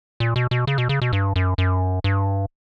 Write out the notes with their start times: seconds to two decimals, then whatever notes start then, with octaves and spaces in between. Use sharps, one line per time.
0.20 A#2
0.36 B2
0.51 B2
0.67 C#3
0.78 B2
0.89 C#3
1.02 B2
1.13 G2
1.36 F#2
1.58 F#2
2.04 G2